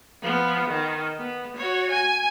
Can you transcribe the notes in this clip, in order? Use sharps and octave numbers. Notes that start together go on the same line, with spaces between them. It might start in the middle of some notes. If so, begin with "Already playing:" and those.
F3 B3
D#3
B3
F#4 C#5
G#5